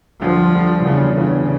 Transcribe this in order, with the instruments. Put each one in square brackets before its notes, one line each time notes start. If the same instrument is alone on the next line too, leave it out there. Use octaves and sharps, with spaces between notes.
[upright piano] D2 D3 G3 [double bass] F3
[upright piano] D2 D3 G3
[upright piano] E2 E3 G3 D4 F4 [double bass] C#3
[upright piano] E2 E3 G3 D4 F4 [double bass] C#3